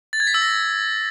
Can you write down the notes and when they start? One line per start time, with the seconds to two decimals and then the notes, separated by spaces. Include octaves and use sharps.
0.13 A6
0.20 G#6
0.27 B6
0.34 E6
0.41 A#6